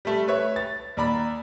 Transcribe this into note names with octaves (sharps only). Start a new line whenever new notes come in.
G3 A3
B4 C#5 E5
A6
D#2 D5 A#5 B5